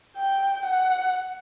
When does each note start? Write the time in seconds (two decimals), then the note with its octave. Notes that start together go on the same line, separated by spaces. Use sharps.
0.17 G5
0.65 F#5